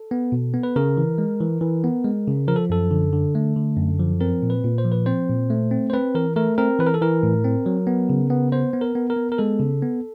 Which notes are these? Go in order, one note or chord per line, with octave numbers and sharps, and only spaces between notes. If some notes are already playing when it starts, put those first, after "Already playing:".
Already playing: A4
B3
B2
B3
B4
C#3 A#4
E3
G#3
E3
E3
B3
G#3
C#3
F3 A#4
A4
F#2 A4
D3
D3
A3
D3
F#2
F3
C4 A#4
A#2
B4
A#2
C5
F3
B4
C4 C5
A#2
A3
C4
C5
C4 B4
E3 A#4
A3 A#4
C4 A#4
E3 B4
A#4
A4
E3 A#4
A2
C4
F#3
B3
C#3
B3
B3 C5
B3
A#4
B3
A#4
B3
A#4
G#3 A4
C#3
B3